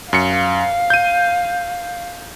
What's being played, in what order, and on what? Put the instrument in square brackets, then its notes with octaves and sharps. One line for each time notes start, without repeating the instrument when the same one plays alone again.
[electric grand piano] F#2 C#7 [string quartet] F5
[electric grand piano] G6 D#7